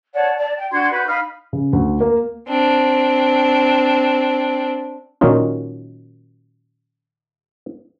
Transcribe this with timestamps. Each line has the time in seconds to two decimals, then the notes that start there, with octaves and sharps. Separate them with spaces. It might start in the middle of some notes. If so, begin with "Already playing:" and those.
0.14 C#5 D5 F#5 A5
0.37 D5 A5
0.56 G5
0.71 D4 F#4 C6 G#6
0.91 F#4 B4 G6
1.07 D#4 F5 B5 F6
1.53 C#3
1.73 D2
2.00 A#3
2.48 C4 D4
5.21 A#2 D#3 F#3 C#4 D#4 F4